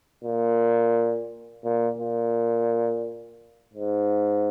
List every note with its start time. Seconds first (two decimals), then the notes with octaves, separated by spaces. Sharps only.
0.24 A#2
1.64 A#2
1.98 A#2
3.74 G#2